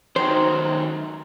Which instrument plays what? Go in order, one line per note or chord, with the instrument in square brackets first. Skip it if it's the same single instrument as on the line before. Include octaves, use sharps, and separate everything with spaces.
[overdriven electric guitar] D#3 F#3 [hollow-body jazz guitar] C5